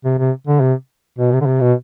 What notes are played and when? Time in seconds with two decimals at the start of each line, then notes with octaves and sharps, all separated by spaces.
0.04 C3
0.19 C3
0.47 D3
0.61 C3
1.18 B2
1.32 C3
1.41 D3
1.46 C3
1.61 B2